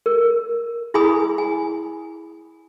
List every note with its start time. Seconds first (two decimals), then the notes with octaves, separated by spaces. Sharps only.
0.06 A#4
0.94 E4 G#4 G#5 B5 D#6
1.38 G#5